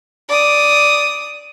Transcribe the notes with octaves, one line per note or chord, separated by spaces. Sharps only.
D5 D#6